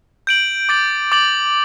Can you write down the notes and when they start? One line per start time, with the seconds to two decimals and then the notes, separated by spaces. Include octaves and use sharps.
0.27 G6 D7 F#7
0.69 D6 A6 D7 F#7
1.12 D6 A6 D7 F#7